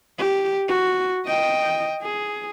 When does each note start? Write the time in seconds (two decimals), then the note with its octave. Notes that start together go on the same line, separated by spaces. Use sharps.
0.19 G4
0.68 F#4
1.26 D#5 G5
2.03 G#4